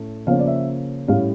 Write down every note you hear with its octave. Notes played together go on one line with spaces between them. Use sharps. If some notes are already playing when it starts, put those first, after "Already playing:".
Already playing: A2 A3 C#4
C#3 F3 A#3 C#4 F5
D5
E5
A2 G3 C#4 F5